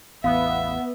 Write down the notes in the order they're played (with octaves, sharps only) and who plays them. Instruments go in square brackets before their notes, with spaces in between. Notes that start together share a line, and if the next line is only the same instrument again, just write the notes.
[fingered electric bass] A1 E2 [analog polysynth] B3 [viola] E5 [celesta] F5